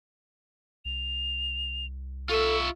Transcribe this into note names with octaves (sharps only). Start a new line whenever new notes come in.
C2 F7
F4 A4 E5 C#6